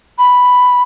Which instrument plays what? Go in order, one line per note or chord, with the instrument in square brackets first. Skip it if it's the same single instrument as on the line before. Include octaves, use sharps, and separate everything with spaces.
[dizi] B5